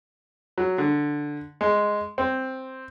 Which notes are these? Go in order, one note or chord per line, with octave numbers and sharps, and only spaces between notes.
F#3
D3
G#3
C4